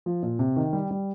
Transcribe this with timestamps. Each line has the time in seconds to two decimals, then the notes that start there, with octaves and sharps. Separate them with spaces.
0.06 F3
0.23 A#2
0.39 C3
0.56 D#3
0.73 G3
0.91 G3